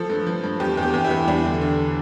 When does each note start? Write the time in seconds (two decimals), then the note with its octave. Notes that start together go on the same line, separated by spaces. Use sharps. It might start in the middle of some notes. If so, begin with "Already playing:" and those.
Already playing: F3 A4
0.10 G2
0.27 F3
0.44 G2
0.60 E2 G4
0.77 E2
0.83 G4
0.94 E2
1.05 E4
1.11 E2
1.27 G3 D4
1.44 D3
1.61 D3